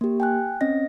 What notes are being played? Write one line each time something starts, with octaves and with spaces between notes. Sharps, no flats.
A#3 G4
G5 G#5 F#6
C4 C#4 D#5 A#6